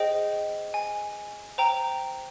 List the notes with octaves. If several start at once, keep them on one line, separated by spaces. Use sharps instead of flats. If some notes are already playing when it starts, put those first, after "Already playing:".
Already playing: G#4 C5 D#5 G5
G#5
C5 G5 A#5